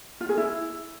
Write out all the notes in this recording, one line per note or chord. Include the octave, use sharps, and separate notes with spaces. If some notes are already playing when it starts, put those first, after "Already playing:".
F4
G#4
E4